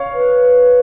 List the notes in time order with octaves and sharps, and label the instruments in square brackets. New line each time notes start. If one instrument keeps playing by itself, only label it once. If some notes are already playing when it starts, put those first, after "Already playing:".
Already playing: [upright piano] C#5 F5
[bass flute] B4